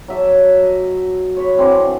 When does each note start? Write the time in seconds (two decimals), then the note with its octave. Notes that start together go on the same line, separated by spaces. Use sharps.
0.08 F#3 E5 A5
0.62 D#5
1.37 C#5 B5
1.57 D3 E3 C4 D6